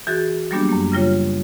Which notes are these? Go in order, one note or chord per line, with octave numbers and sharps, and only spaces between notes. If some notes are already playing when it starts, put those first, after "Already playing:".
E3 F#4 G#4 A6
F#3 G3 A#3 B3 D4 G4
F#2 A#3
C#3 G3 F4 C#5